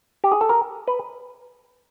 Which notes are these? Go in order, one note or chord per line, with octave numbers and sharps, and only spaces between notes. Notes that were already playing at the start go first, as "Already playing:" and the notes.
G4
G#4
A4
A#4
B4